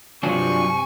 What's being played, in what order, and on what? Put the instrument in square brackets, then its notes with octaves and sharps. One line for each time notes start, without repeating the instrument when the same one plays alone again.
[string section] G2 C3 [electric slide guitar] F#3 D4 F4 [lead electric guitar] G#5 [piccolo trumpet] C#6